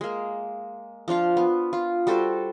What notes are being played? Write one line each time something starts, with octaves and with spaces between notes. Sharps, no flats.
G#3 A#3
F3 D4 F4 F5
B3
F4
G3 F#4 A4 C5